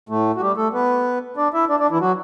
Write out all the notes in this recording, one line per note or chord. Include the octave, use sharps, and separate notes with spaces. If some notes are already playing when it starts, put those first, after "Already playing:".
A2 A3
F#4
G3 G4
A3 A4
B3 B4
D4 D5
E4 E5
D4 D5
D4 D5
E3 E4
F#3 F#4